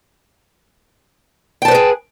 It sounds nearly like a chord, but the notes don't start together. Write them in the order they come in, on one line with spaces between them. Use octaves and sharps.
G5 A5 C5 B4 G#4